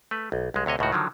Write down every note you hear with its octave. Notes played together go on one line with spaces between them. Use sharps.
A3 B4
B1
C2 G#3
D2 C3 C#5 D#5
C#2 A2 D#3 F#4
D3 D#3 F3 F#3